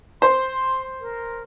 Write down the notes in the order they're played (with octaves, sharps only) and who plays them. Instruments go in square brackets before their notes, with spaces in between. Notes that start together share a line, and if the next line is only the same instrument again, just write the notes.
[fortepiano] C5 [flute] C6
[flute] A#4